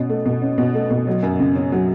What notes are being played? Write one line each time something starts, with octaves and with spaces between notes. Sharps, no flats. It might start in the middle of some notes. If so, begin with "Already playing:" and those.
Already playing: B2 C#4
A3
B2
C#4
B2
A3
B2
F#3
F#2
C#3
C#4
F#3